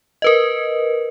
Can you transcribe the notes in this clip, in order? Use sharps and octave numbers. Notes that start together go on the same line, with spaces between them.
A#4 B4 D#5